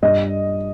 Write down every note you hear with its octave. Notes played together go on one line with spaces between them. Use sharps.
G2 D#5